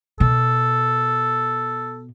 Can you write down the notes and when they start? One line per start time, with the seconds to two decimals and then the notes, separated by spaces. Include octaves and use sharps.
0.20 B2 A4